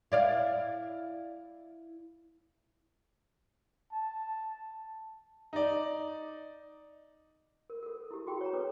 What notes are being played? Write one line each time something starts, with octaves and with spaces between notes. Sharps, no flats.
E4 D5 F5
A5
D#4 D5
A#4
A4 A#4
E4 G4
F#4 G#4 G5 B5
C#5 A5 A#5
C#4 A4 B4 C#5 D6